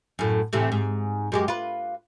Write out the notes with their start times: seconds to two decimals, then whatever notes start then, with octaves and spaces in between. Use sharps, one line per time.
0.19 F#2 A2
0.53 A2 C3 E3
0.72 G#2
1.32 F#2 G#3 G4
1.48 F4 B4